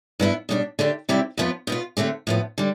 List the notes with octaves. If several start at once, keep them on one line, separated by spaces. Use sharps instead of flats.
G2 E3 B3 E4
B2 G3 B3 D4
D3 A3 D4 G4
C3 G3 C4 E4 G4
F2 C3 F3 B3 F4
B2 B3 F4
D3 A3 C4 G4
A2 F3 B3
D3 G3